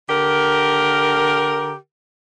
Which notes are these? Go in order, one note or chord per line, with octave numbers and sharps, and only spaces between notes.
D3 G4 A#4